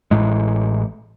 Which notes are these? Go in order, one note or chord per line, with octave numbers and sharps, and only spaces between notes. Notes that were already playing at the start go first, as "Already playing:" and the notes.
A1 A2 G#3